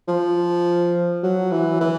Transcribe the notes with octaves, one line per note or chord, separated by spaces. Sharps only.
F3
F#3
E3
E3